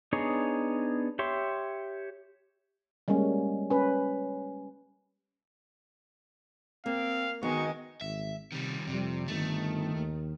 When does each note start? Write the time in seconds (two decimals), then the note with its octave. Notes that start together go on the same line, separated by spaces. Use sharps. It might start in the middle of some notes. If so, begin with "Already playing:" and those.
0.13 B3 D4 D#4 G#4 C#5
1.19 G4 C#5 E5 C6
3.08 G3 G#3 A#3 C#4
3.70 C#4 B4
6.86 A#3 C4 F5
7.43 D#3 G#3 B3 D#4 F#4 C#6
8.01 G#1 E5
8.52 C3 D#3 G3
8.87 F2 C3 G3
9.28 G1 D#3 A3
9.95 D#2